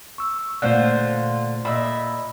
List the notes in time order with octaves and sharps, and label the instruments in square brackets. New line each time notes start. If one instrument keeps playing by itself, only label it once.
[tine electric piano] C#6 E6
[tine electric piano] A#2 A3 F#6 [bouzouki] D3 F4 C5
[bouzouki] A#2 E5 [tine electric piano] D#5 B5